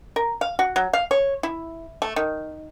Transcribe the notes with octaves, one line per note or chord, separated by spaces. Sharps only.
A#4
F5
F#4
F#3
F5
C#5
E4
A3
D#3